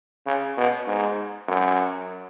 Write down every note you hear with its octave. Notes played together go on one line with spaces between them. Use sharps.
C#3
B2
G#2
F#2